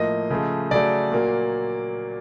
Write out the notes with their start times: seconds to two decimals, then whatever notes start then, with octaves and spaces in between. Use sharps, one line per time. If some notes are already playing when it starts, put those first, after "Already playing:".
Already playing: A2 F3 A#3 D#5
0.30 C#3 F3 A3
0.71 C#3 F#3 A3 D5
1.12 A#2 F#3 A#3